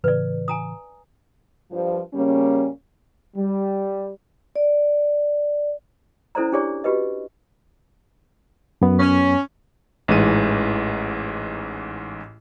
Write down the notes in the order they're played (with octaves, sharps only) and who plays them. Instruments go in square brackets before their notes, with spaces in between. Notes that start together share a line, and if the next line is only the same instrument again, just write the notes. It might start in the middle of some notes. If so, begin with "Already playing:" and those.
[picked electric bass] A2 C#3 E3 [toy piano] B4 D5
[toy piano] G#5 A#5 D#6
[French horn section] G2 F3
C#3 G3 A#3 C#4
[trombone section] G3
[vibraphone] D5
[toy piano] C#4 E4 A4 C5 D5 A#5
D4 G4 G#4 C#5 D5
F#4 G4 B4 D#5
[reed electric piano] F#2 B3
[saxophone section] C#4
[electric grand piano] A1 G#2 E3 G#3 D#7